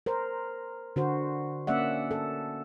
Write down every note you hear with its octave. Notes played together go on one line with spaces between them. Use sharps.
A#4 C5
D3 F#4 C5
A#3 C#4 D5 E5 F#5
A4